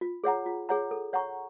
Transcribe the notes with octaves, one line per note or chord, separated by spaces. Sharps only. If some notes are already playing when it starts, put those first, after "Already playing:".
F4
G#4 C#5 F#5 A#5
F4
G#4 C#5 F#5 A#5
A4
C#5 F#5 A#5 C#6